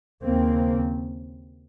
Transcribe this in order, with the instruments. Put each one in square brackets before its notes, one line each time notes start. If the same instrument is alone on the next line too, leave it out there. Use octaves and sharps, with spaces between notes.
[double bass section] D#2 C#3 A#3 C4